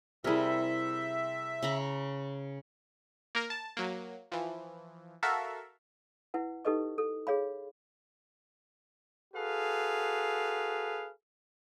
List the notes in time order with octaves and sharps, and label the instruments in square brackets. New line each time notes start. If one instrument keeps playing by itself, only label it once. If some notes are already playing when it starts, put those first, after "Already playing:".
[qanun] C3 G3 [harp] E4 G#4 A#4 [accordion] E5
[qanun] C#3 A#5 B5
[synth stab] A#3 A#4
A5
F#3 A#3
E3 F3
F#4 A4 A#4 E5 F5
[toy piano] E4 B4 F#5
D#4 G4 A4 B4 D#5 C#6
A4
G#4 C#5 F5 B5
[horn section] F#4 G#4 A4 B4 F5